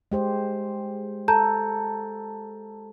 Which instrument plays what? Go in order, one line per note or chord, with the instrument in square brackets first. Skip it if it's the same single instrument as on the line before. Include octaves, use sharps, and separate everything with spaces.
[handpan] G#3 G4 C5
[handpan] A4 [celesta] A5 A#5 G6